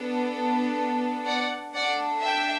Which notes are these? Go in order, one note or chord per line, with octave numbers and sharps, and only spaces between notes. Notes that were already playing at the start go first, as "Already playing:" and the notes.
Already playing: B3 D4 A4
D5 F#5
A3 D4 A4 D5 F#5
E5 G5